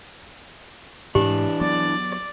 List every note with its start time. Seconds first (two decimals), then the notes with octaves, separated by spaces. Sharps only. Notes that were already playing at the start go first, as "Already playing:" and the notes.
1.15 G#2 E3 D4 G4
1.61 F#3 B3 D5